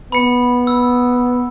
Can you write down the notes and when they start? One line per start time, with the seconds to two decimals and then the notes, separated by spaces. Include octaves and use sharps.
0.12 B3 B5 C#7
0.67 E6